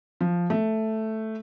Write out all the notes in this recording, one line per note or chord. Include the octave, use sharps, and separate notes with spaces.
F3
A3